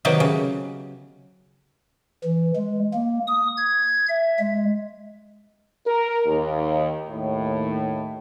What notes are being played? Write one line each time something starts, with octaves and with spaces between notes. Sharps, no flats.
C3 D#3 F#3 B3 G4
C#3
E3
G#3
A#3
D#6
G#6
E5
G#3
A#4
D#2
D#2 A2